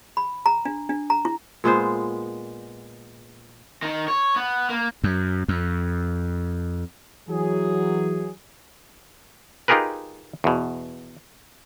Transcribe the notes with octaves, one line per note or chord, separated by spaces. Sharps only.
B5
A#5
D4
D4
A#5
E4
A#2 G#3 B3 C5
D#3
C#5
B3
A#3
F#2
F2
E3 F#3 G#4
D#4 F4 G4 G#4 A#4 B4
E2 B2